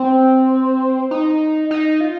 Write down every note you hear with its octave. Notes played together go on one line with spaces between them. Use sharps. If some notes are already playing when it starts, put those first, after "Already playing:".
Already playing: C4
D#4
D#4
F4